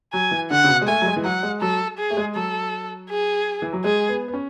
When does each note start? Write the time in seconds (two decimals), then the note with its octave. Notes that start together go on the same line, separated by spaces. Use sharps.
0.13 F#3 G#5
0.31 E3
0.50 D3 F#5
0.64 C#3
0.69 B2
0.82 G#3
0.88 A3 G#5
1.01 F#3
1.06 G#3
1.17 E3
1.24 F#3 F#5
1.43 G#3
1.61 F#3 A4
1.98 G#4
2.10 A3
2.17 G#3
2.35 F#3 A4
3.09 G#4
3.62 E3
3.73 F#3
3.84 G#3 G#4
4.09 B3
4.28 B3
4.34 C#4